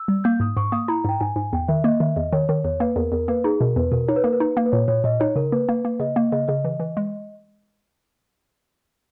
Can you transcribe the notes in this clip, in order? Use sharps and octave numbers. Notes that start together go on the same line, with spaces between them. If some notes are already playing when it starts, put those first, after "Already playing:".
Already playing: E6
G3
A#3 G6
G#2 D#6
G#2 C#6
A#3 D#6
E4 A#5
G#2 G5
G#2 G#5
G#2 G#5
E2 G5
D#3 E5
A#3 D#5
D#3 E5
E2 D#5
D#3 C#5
D#3 C#5
E2 C#5
A#3 B4
E2 A#4
E2 A#4
A#3 B4
D#4 G#4
B2 A#4
E2 B4
B2 A#4
D#4 C#5
B4
A#3 A#4
B4
D#4
A#3
B4
A#2 C#5
A#2 C#5
A#2 D#5
D#4 C#5
C#3 A#4
A#3 B4
A#3
A#3
C#3 D#5
A#3
C#3 D#5
C#3 D#5
E3
E3
G#3